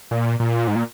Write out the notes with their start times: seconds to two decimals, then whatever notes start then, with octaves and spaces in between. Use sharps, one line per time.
0.11 A#2
0.40 A#2
0.67 G#2
0.76 A#2